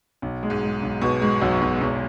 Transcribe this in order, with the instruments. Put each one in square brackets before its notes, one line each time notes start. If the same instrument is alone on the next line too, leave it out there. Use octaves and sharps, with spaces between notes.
[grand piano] B1
G#3
[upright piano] G#2
[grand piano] G#3
B1
[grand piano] B1 [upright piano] B2
[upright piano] G#2 [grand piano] G#3
[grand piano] B1 [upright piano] F#2
[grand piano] B1 [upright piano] F#2
[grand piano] B1 [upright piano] E2